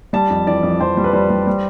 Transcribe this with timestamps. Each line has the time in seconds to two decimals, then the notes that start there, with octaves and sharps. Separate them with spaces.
0.13 G3 A5
0.30 F2
0.47 E3 D5
0.63 F2
0.80 F2 C5
0.97 G3
1.04 B4
1.13 G3 C5
1.30 G3
1.47 G3